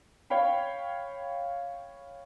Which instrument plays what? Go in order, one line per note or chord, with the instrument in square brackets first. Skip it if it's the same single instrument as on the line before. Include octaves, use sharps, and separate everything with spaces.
[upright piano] C#5 F5 G5 B5